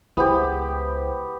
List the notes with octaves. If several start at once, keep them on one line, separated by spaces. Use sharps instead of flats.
C#2 B3 E4 G4 G#4 C5